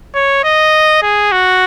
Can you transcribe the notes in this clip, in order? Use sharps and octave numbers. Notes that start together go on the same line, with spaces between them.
C#5
D#5
G#4
F#4